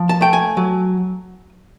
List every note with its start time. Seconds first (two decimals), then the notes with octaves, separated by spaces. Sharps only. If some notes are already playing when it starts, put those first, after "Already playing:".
Already playing: F3
0.09 A5
0.21 A3 G5
0.33 G#5
0.57 F#3